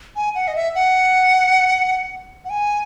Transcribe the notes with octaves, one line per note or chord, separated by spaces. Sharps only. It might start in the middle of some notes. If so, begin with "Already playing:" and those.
G#5
F#5
D#5
E5
F#5
F#5
G#5